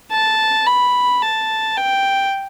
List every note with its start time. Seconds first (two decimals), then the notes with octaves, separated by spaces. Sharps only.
0.12 A5
0.67 B5
1.22 A5
1.77 G5